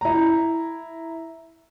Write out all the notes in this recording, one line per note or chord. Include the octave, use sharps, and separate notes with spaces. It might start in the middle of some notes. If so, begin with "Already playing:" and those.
E4 A#5